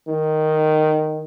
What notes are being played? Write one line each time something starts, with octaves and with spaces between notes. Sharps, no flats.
D#3